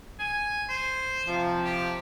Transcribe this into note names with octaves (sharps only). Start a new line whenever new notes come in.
G#5
C5
C3 F3
G4